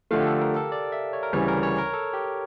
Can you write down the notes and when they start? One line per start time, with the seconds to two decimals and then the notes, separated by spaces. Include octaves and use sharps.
0.11 D3 F3 A3 F5
0.20 G4
0.27 A4
0.41 A#4
0.56 A4
0.72 D5
0.92 E5
1.13 C#5
1.23 A#4
1.33 D2 C#3 E3 G3 C#5
1.48 A#4
1.63 C#5
1.78 A#4
1.93 A4
2.14 G4